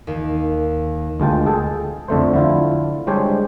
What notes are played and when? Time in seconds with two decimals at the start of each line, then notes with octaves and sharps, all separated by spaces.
0.07 D#2
1.20 D2 G#3 F4 G5 A5
1.46 G#4 A4 G5 A5
2.08 F2 D3 A3 C5
2.34 D3 E4 F4
3.07 G3 G#3 D4 G4 C5 C#5